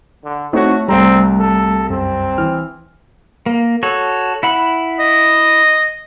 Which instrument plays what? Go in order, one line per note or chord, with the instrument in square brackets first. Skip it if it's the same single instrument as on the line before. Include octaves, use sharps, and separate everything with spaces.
[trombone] D3
[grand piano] A3 C#5 [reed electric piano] C4 D#4 E4 [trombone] F#4
[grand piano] C2 A#5 [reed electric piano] G3 A3 [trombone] C4
[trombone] A4
[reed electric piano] F#2 [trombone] C4
[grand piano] E3 [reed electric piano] F6
[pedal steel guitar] A#3
F#4 A4 C#5
E4 F#5 B5
[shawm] D#5